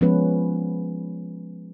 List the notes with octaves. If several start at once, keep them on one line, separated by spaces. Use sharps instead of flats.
F3 G#3 B3 C#4 B4